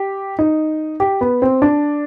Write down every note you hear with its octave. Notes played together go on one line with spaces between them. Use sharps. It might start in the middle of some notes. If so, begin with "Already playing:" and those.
Already playing: G4
D#4
G4
B3
C4
D4